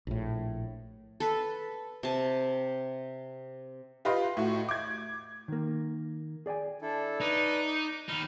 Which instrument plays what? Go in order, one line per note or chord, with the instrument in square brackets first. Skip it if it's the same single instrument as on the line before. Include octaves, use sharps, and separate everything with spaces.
[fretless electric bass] A#1 A2
[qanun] A4 B4
C3 A5
[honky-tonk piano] F4 G4 B4 D#5 F5 C6
A2 F#4
D6 G#6
[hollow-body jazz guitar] D#3 A#3
G#4 D5 G5 G#5
[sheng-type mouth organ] D4 E4 A4
[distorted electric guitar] D#4 [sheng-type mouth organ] B4 D5
[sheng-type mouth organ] D6
[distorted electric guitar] D#2 D#4 [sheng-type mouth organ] B5 F6